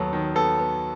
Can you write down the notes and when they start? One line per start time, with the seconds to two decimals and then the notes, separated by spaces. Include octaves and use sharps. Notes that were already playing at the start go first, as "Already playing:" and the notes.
Already playing: D#2 F#3 B3 A4
0.13 D#3
0.35 B3 A4
0.59 B3